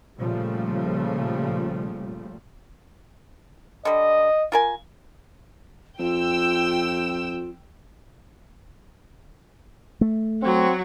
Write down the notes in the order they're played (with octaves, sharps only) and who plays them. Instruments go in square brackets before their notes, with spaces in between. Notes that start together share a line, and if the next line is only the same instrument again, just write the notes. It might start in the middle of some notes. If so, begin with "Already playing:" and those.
[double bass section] A#2 C#3 F3 G3 A3
[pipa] D3 G3 [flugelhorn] D#5
[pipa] F4 A#4 G#5
[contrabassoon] F2 [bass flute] F4 [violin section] G5 E6
[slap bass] A3
[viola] F#3 F#4 [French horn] C4